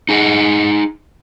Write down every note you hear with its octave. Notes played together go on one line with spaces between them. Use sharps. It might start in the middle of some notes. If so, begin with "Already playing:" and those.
D#4 G#4 D#5 F#5